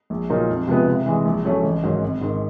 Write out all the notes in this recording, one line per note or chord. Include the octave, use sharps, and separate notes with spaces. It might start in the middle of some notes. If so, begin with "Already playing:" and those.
A#1
A#2 F#3 A#3 D#4
F2
C3 F3 G#3 B3
C3
E3 G#3
A#1
A2 F#3 A3 C#4
A1
G#2 D#3 F#3
G#1
G#2 D#3